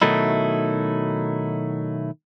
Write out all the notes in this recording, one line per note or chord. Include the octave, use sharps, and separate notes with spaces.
B2 D#3 F#3 A3 D#4 E4